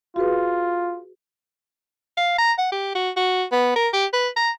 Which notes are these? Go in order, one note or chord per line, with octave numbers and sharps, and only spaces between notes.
F4 F#4 G#4 B4
F5
A#5
F#5
G4
F#4
F#4
B3
A#4
G4
B4
A#5